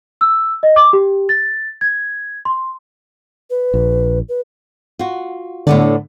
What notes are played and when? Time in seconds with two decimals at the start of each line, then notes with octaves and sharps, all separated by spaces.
0.21 E6
0.63 D#5
0.76 D6
0.93 G4
1.29 A6
1.81 G#6
2.45 C6
3.50 B4
3.74 A#1
4.29 B4
4.99 F4 F#4
5.67 A2 D3 B3 D5